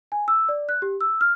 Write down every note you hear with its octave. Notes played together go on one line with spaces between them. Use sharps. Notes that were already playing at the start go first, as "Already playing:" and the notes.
G#5
E6
D5
F#6
G4
E6
F6